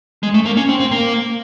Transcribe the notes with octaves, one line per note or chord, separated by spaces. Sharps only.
G#3
A3
A#3
C#4
C4
C4
A#3